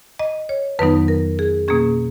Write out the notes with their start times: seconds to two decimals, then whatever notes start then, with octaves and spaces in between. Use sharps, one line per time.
0.19 D#5
0.49 C#5
0.79 F2 D#3 F#3 B3 D#4 B4
1.08 A#4
1.39 G#4
1.68 B2 A#3 C#4 G#4